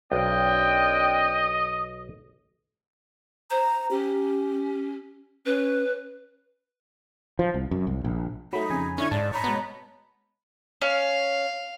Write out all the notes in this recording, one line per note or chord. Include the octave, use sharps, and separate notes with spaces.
B1 C4 D4 D#5 F5 G5
C5 A#5
C#4 G4
C#4 B4
F3
C2
F#2
C2
A#1
F#3 A3 D#4 B5
F2 C#3 G#5
D3 C#4 E4 C#6 G#6
G#2 D5 A5
C#5 A#5 B5
B2 G#3 B3
C#4 F5